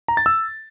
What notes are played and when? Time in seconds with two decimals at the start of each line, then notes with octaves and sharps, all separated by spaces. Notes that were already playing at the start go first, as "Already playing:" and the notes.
0.08 A#5
0.17 A6
0.26 E6